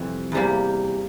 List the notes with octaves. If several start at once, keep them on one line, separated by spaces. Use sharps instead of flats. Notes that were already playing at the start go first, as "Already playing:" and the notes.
Already playing: F2 C3 E3 G3
E2 C3 E3 G3 A#3